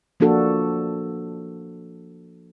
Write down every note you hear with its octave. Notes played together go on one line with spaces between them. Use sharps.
F3 A#3 D4 F#4 A4